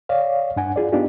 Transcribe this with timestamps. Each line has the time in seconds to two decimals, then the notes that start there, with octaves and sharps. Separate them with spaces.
0.09 C#5 D5 F5
0.56 G2 D4 F#5 G#5
0.76 F4 G#4 D5
0.92 B3 D4 D#4 F4 G4